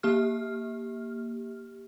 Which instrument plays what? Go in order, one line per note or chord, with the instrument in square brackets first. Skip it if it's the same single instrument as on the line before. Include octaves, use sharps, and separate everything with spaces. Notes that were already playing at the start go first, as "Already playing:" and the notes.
[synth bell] A#3 G4 F6